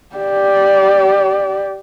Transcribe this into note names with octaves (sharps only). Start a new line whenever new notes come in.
G4 D5